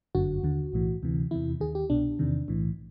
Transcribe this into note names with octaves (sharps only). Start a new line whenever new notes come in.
G1 F#2 D3 F#4
D#2 D3
B1 A2 E3
D2 C3 E3
E2 C3 E3 E4
D#2 D#3 G#4
G4
C2 B2 D4
E2 C3 D#3
B1 A2 E3